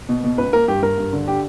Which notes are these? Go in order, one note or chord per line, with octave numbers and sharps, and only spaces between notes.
B2
B2
C#2 B4
A#3 A#4
G2 G4
G2 A#4
G2
D3
G4